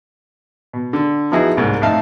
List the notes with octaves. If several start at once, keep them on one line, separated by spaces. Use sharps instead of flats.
B2
D3
F3 B3 D#4 E4 F#4 G#4
C2 G#2 A#3
F2 A2 D#4 E5 F5 A5